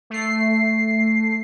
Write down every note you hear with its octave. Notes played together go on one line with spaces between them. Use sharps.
A3 C7